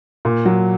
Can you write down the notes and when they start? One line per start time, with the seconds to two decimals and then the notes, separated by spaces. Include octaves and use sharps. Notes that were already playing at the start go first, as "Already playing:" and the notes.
0.25 A#2
0.45 F#3